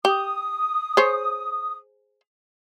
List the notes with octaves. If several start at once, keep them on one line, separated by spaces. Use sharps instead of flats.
G4 D#6
G#4 C5 C#5